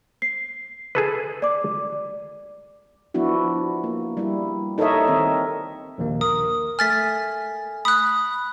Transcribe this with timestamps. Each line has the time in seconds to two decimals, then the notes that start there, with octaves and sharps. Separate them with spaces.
0.22 C7
0.95 G#4 A4 B4
1.42 D5 D6
3.14 F3 B3 D4 E4 F#4
3.84 A#3
4.17 G3 E4
4.78 D#4 A4 A#4 C#5 D#5 E5
5.08 D#3 C4 D#4 A#4
5.98 A#1 D#2 A#3
6.21 A#4 D#6
6.79 A3 G#5 F6 A6 B6
7.85 B5 D#6 F#6